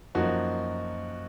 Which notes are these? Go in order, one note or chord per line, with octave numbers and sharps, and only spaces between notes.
F#2 F3 A#3 D#4 F#4